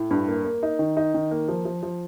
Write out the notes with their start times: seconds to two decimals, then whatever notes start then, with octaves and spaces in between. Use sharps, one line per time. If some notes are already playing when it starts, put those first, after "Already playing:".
Already playing: A2
0.11 G2
0.28 A#3
0.45 A#3
0.63 D#4
0.79 D#3
0.97 D#4
1.14 D#3
1.31 A#3
1.49 F3
1.65 F3
1.83 F3